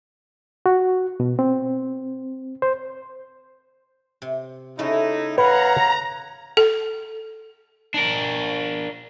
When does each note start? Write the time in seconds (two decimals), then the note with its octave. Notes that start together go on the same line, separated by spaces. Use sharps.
0.66 F#4
1.20 B2
1.39 C4
2.62 C5
4.22 C3
4.79 C#3 A3 D#4 E4
5.38 B4 C#5 F5 F#5 A#5
6.57 A4
7.94 D4 A#4